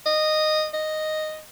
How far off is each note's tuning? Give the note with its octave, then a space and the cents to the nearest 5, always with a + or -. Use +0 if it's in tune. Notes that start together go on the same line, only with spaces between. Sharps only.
D#5 -10
D#5 -5